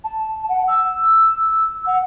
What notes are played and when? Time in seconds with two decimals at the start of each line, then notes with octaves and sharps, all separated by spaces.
0.04 A5
0.49 F#5
0.68 E6
1.86 F#5